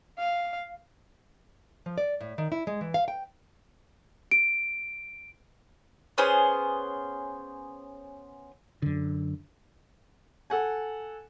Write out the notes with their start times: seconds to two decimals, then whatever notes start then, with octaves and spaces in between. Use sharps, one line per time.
0.18 F5
1.86 F3
1.98 D5
2.21 A2
2.38 D#3
2.52 E4
2.67 G#3
2.81 E3
2.94 F5
3.08 G5
4.31 D7
6.18 B3 C#4 G#4 C5
8.82 F#2 D3
10.50 A4 F#5 G#5